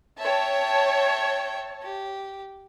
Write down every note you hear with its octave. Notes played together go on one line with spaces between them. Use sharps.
C#5 E5 G5 A5
G4